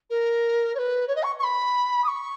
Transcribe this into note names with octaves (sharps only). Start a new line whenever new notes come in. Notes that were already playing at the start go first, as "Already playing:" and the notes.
A#4
C#5
B4
C#5
D#5
C#6
C#6
B5
D#6
C#6